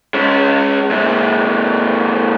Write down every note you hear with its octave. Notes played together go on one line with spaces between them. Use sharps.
G#3 C#4
A#2 G#3